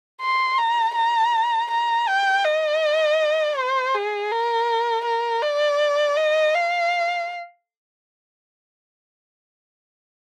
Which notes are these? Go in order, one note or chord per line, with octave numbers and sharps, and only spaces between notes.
C6
A#5
A#5
A#5
G5
D#5
C5
G#4
A#4
A#4
D5
D#5
F5